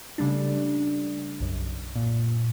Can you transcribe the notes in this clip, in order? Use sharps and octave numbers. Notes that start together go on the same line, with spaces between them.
C#3 G3 A3 D4
B1 F#2
A#2